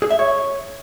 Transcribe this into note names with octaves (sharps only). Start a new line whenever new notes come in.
G#4
E5
C#5